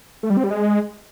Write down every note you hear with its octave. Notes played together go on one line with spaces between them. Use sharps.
A3
G3
C4
G3
G#3